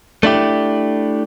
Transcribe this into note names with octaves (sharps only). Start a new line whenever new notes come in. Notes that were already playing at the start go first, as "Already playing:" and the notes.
A3 D4 E4 G4